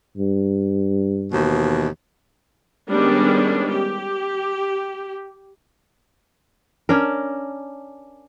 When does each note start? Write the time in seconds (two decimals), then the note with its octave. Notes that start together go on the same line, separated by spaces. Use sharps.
0.18 G2
1.33 D#2 B2 E3
2.91 D#3 G3 G#3 B3 C#4 D4
3.73 G4
6.89 C#4 D4 A#4